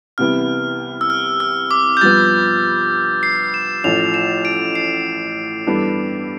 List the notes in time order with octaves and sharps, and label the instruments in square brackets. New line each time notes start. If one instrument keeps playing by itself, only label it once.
[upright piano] C2 C3 E3 B3 E4 [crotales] F6
[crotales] E6
F6
E6
D6
G6
[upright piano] G2 F3 B3 [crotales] A6
[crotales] C7
E7
[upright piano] A1 A2 F3 [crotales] F7
[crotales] E7
D7
C7
[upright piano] G2 E3 B3 D4 A4